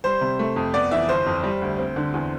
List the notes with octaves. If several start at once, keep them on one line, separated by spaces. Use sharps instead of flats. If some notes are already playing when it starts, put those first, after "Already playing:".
G3 C5
C3
A3
F2
B3 D5
E3 E5
G1 C5
F2
G3
D2
C4
D3
E2